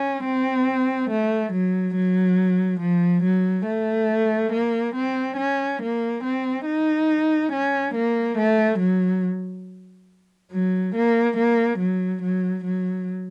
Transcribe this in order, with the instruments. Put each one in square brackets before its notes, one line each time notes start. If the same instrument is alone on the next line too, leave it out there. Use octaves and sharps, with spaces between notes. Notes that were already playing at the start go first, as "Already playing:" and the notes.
Already playing: [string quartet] C#4
C4
A3
F#3
F#3
F3
F#3
A3
A#3
C4
C#4
A#3
C4
D#4
C#4
A#3
A3
F#3
F#3
A#3
A#3
F#3
F#3
F#3